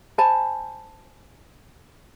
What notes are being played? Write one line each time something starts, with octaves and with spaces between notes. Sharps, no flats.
C5 G#5 A5 B5